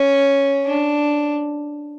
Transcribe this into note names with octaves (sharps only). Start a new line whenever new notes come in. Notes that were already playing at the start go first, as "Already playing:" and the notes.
Already playing: C#4
D4